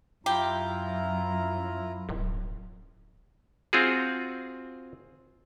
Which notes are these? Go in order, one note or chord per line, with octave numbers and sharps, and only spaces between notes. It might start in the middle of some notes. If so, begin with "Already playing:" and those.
F#2 E4 F4 G4 A#5
D1
C4 F4 F#4 G#4